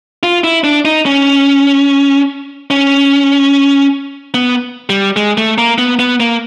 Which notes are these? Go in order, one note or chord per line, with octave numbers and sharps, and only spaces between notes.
F4
E4
D4
D#4
C#4
C#4
B3
G3
G#3
A3
A#3
B3
B3
A#3